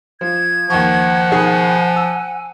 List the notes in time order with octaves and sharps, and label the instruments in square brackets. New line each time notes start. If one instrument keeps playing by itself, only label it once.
[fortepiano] F3 [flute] G#6
[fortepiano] D#2 C#6 [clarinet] F3 [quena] F#5
[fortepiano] B2 D#3 G#4 [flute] G#5
[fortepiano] E6